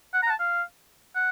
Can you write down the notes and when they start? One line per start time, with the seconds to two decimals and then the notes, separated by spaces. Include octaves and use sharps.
0.14 F#5
0.22 A#5
0.27 F#5
0.30 A5
0.40 F5
1.15 F#5